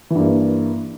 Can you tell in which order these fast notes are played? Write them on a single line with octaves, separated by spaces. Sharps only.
E3 G2 A#3